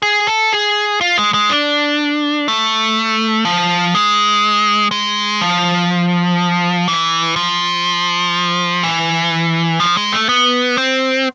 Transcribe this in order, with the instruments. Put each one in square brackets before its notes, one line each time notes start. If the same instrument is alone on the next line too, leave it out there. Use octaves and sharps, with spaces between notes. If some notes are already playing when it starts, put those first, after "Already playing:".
[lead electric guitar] G#4
A4
G#4
F4
G#3
G#3
D4
A3
F3
G#3
G#3
F3
E3
F3
E3
F3
G#3
A3
B3
C4